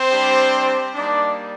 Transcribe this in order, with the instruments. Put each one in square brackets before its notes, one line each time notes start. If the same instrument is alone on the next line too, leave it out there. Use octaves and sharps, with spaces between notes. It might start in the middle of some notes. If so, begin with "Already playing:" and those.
Already playing: [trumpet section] C4 C5
G3 D4 G4
G3 A#3 D4 D#4 D5